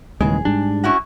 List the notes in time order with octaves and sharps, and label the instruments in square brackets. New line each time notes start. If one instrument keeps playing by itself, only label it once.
[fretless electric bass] D#1 D#2 E3 [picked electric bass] C#3 G#3 [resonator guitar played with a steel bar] G#4
[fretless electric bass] G#2 G3 [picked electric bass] D4
[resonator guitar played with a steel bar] C#4 E4 F#4